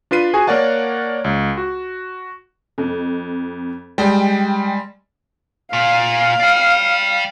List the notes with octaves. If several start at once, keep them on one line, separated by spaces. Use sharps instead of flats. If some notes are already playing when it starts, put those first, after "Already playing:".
D4 F4 B4 C7 D#7
F#4 G#4 G#5
A#3 A#4 C#5 D5 F#5 A5
C#2
F#4
F2
G3 G#3 G5
A#2 F5
D5 G5